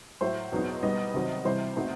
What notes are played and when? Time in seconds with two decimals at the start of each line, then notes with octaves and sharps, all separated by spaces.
0.21 A2 F#3 A3 C5
0.52 E2 B2 F#3 B3 D#4
0.83 B2 G3 B3 D#4 D#5
1.14 C3 D#3 F#3 C4
1.45 C3 E3 G3 C5
1.76 B2 A3 C4 D#4